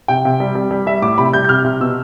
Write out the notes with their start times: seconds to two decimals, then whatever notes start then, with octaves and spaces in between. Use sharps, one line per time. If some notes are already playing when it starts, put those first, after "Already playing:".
0.08 C3 G5
0.25 C3
0.40 G3
0.55 G3
0.71 G3
0.86 G3 E5
1.02 A2 D6
1.18 C3 B5
1.33 G3 G6
1.45 G6
1.49 C3 F6
1.64 C3
1.80 B2 E6